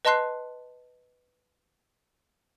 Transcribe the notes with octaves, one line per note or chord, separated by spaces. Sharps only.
B4 D#5 A5 C6 F#6 C7